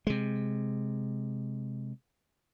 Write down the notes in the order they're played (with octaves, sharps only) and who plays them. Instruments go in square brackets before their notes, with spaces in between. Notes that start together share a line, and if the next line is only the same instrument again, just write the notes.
[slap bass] C3 G#3